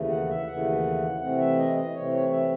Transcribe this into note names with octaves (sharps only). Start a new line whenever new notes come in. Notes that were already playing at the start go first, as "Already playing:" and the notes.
Already playing: D#2 C#3 E3 A3
F#5
E5
D#2 C#3 E3 A3 F#5
C3 E3 A3 C4 F#5
E5
D#5
D#5
C3 E3 A3 C4 C#5
C#5
E5